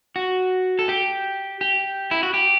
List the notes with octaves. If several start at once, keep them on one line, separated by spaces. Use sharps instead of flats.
F#4
A4
G4
G4
E4
F#4
G4